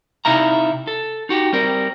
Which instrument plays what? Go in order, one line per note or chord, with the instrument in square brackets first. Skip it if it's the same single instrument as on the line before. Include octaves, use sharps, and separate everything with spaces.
[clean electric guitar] C3 D#4 E4 F5 A#5
A4
D#4 F#4 G4
G3 C4 A#4